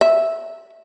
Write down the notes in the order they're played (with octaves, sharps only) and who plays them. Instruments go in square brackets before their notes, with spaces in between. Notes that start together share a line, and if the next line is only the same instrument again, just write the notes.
[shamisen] E5